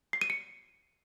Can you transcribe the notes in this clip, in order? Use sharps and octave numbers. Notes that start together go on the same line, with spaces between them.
C7
D#7
C#7